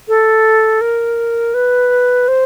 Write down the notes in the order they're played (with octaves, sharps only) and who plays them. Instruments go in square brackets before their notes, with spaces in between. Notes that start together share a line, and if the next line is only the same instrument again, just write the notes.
[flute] A4
A#4
B4
C5